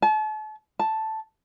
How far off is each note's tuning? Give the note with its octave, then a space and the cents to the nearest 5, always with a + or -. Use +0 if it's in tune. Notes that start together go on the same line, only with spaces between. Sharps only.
A5 -40
A5 +0